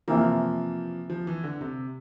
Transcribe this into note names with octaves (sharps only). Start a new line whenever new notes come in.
C3 E3 F3 A#3
F3
E3
D3
C3